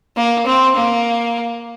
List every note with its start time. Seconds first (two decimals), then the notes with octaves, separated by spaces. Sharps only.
0.17 A#3
0.46 C4
0.76 A#3